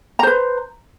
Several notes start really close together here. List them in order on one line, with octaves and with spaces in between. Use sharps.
A#5 C5 B4